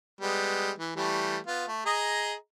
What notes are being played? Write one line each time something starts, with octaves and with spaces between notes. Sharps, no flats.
G3 G#3 B3
E3
E3 G3 A3
B3 F4
A3
G#4 D#5 A#5